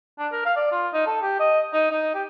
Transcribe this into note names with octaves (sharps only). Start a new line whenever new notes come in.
D4
A#4
F5
D5
F4
D#4
A4
G4
D#5
D#4
D#4
G4